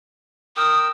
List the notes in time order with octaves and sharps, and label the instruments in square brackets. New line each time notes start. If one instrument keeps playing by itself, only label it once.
[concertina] A#4 G5 E6 [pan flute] D#6